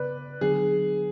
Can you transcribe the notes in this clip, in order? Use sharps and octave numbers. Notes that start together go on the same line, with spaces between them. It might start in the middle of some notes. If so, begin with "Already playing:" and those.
Already playing: C#3 B3 B4 D5
D3 F#3 B3 D4 G#4